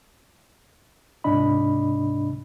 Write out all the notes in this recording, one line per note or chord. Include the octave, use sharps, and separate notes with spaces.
C#2 G#2 C3 D4 D#5 B5